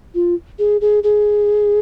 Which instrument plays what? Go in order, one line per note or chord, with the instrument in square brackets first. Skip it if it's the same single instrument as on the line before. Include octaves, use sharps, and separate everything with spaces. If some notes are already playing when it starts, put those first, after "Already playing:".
[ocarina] F4
G#4
G#4
G#4